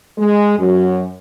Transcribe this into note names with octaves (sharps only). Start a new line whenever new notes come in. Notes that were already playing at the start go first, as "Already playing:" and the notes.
G#3
F#2